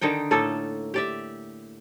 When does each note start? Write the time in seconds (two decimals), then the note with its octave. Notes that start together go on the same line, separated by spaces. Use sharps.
0.01 D3 D#3 D#4 G5
0.31 A2 A3 A#3 A4
0.94 G4 D5 E5